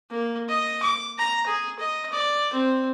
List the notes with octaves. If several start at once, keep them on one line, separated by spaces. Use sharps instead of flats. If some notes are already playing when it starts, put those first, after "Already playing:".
A#3
D#5
D6
A#5
G#4
D#5
D5
C4